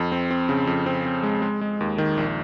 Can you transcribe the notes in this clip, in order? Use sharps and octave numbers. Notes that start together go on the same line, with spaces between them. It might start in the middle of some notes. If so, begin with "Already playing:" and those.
Already playing: F2
C4
C4
C#3
F2
C4
C4
G#3
G#3
G#3
D#2
D#3
A#1